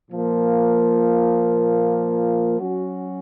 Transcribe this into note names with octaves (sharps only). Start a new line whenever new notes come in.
A#2 F3 A#3
F#3 C#4 F#4